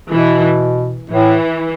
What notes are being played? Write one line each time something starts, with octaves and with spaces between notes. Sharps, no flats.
B2 E3
A2 E3